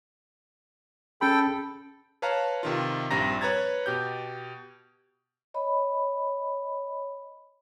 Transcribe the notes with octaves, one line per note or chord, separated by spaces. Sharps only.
C#4 G#4 A4 G5 B5
B4 C#5 F5 A5 A#5
C3 D#3 F4
A#1 G2 G3 C4 A#5 A#6
B4 C#5 A#5 G#6 A6
B2 G4 G6
C#5 D#5 B5